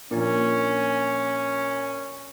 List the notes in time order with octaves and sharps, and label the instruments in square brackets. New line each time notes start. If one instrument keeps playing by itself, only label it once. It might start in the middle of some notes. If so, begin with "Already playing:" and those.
[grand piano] A#2 [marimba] F3 A#3 D4 [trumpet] C#4